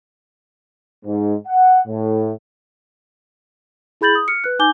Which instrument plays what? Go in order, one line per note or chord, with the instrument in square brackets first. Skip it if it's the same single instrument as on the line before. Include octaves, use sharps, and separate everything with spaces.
[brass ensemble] G#2
F#5
A2
[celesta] E4 G#4 B5 G6 A6 F#7
D#6
F6 C#7
B4 F#6
D#4 G#5 D6 G6 G7